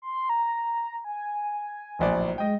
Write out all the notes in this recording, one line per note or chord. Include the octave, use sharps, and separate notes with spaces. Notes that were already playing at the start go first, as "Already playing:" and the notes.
C6
A#5
G#5
D1 A#1 D5
G#3 D#5 G5